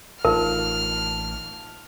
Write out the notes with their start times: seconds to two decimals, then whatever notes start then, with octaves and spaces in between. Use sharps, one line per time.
0.25 A1 D#4 F4 A#4 A5 F6